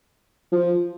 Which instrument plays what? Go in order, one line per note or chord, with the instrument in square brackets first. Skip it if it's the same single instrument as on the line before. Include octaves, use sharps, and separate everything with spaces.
[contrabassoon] F3